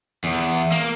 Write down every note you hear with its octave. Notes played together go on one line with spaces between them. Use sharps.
E2
A#3